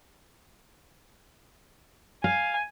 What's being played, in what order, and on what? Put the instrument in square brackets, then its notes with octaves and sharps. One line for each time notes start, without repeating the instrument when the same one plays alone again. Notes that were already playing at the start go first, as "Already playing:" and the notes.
[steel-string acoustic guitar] F5 [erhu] G#5